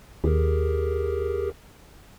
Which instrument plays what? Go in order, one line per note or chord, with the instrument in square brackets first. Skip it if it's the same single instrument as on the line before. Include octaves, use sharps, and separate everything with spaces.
[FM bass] D#2 [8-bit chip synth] G4 G#4 A#4